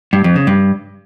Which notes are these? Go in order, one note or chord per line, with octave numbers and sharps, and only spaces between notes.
G2
F2
C#3
G2